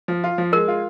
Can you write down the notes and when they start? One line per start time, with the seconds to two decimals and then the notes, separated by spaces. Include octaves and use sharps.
0.08 F3
0.24 F4
0.38 F3
0.52 G#3 A#4
0.68 F4